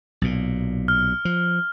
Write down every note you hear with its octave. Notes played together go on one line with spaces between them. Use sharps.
B1 A#2
F6
F3